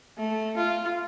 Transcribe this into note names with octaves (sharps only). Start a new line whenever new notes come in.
A3
F4